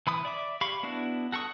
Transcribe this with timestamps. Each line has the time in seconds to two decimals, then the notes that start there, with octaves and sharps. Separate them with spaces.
0.07 E3 B5 D#6
0.25 D5 E5 D6
0.61 G4 F5 B5 C#6
0.83 B3 D4 E4 F#4
1.32 F#4 A4 F#5 C#6 D#6